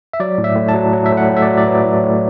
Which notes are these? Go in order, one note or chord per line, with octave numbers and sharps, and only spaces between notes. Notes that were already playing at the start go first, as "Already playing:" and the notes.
E5
F#3 D5
A2
E5
A2
A5
F#3
F#3
E5
A2
F#5
A2
E5
F#3 D5
D5
F#3 B4
A2
A2